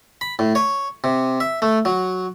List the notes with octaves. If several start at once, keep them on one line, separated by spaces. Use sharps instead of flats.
B5
A2
C#5
C3
E5
A3
F#3